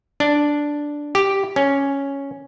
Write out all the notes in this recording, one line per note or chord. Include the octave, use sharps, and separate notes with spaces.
D4
G4
C#4